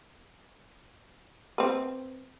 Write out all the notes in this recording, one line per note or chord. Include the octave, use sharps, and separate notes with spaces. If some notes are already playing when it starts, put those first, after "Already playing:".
C4 B4